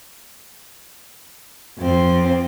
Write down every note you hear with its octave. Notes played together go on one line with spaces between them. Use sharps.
F2 C4